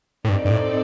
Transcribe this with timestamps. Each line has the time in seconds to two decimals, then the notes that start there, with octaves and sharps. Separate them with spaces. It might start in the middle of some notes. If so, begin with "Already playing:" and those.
0.25 A2
0.28 G2 C4 D#4 A4 D5
0.45 G2
0.50 A2